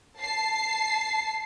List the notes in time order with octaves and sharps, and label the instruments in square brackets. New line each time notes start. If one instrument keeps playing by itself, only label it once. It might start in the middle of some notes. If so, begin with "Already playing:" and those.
[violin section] A5 C7